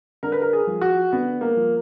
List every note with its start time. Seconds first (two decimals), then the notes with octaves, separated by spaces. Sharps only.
0.23 D3 A#4
0.32 B4
0.42 A#4
0.53 G#4
0.67 F3
0.81 F#4
1.12 D3 B3
1.41 A#3
1.57 F3